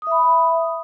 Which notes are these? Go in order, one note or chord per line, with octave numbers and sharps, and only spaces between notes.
E5 B5 D#6